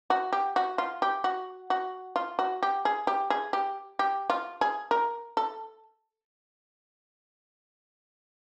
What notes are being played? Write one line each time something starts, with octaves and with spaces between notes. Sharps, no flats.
F#4
G4
F#4
F4
G4
F#4
F#4
F4
F#4
G4
G#4
G4
G#4
G4
G4
F4
G#4
A#4
A4